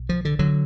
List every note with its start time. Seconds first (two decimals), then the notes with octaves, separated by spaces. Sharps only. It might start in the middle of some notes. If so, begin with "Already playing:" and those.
Already playing: B1
0.09 F3
0.25 D3
0.39 D3 F#3